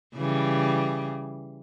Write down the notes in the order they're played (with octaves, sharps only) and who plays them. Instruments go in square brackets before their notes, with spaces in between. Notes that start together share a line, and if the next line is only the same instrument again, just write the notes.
[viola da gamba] C#3 E3 G3